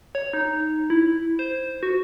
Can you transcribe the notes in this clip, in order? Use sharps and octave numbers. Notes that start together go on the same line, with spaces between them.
C#5
D#4
E4
C5
F#4